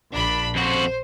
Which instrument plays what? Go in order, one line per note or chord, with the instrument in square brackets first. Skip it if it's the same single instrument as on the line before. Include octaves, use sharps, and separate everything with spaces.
[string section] A#1 D4 B5
[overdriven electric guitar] F2 F#4 [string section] C5